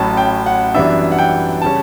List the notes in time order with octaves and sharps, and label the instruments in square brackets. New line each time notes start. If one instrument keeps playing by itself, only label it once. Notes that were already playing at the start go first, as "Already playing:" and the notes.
Already playing: [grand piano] A1 A2 F#3 C#4 A5
G5
F#5
F#2 E3 G3 B3 D4 E5
F#5
G5
C#3 G3 C#4 A5